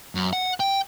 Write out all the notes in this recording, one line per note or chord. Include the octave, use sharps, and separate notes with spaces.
F#2
F#5
G5